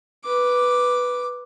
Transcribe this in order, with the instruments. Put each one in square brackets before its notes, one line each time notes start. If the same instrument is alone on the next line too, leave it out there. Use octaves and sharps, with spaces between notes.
[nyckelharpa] B4 D6